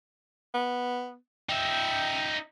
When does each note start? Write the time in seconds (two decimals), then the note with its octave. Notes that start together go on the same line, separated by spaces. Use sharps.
0.54 B3
1.49 D#4 E5 G5